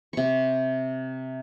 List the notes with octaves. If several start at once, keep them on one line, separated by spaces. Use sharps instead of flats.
C3 C#6